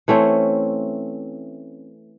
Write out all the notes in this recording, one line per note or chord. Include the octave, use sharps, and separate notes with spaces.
E3 A3 C4 C#4